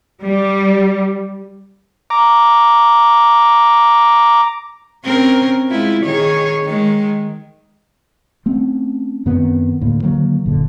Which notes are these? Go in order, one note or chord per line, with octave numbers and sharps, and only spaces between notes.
G3
A#5 D6
C4 C#4 A#4
G#3 E4 F4
D#3 G#4 C#5
D#3 G#3
A3 C4 C#4
F#2 D#3 B3 C4
D2 A2 A#3
D3 D#3 F#3 A#3
F#1 A#2 D3